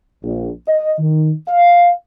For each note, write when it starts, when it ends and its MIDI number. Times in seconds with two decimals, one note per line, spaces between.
0.24 0.50 34
0.68 0.93 75
0.99 1.32 51
1.48 1.91 77